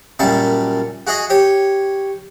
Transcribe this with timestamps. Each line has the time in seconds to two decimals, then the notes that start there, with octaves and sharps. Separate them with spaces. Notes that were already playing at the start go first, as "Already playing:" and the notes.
0.19 F#2 A#2 G3 A5
1.07 F#4 G#4 D#5
1.30 G4 C#5